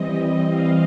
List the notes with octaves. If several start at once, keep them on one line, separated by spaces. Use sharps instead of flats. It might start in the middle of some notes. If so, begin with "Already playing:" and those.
Already playing: E3 G3 C4 D#5
F5